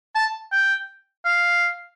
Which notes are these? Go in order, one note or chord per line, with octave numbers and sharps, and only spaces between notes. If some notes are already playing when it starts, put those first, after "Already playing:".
A5
G5
F5